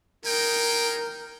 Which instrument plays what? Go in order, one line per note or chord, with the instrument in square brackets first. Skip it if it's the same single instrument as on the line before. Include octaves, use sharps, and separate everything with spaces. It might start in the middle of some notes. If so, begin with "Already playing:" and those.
[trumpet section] G#3 D#4 G5 [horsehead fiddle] A#4